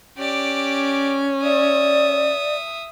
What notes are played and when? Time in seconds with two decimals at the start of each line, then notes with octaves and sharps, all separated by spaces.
0.18 C#4 G4 D5
1.42 D5 E5 D#6